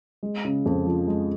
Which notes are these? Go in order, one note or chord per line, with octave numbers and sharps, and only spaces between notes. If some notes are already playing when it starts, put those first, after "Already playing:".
G#3
C#3
F2
F3
G#3